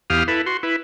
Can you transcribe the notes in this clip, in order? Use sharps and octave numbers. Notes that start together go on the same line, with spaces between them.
E2 G4 F5 D#6 F6
E4 A4 B4
F#4 C6
E4 B4